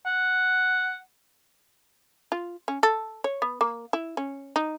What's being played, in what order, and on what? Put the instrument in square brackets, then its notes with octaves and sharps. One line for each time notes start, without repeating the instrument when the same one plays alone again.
[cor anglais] F#5
[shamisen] F4
C#4
A4
C#5
B3
A#3
E4
C#4
D#4